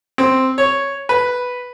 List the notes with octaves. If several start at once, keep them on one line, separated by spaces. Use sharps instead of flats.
C4
C#5
B4